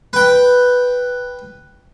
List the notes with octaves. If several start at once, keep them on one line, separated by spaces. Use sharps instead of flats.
B4 G5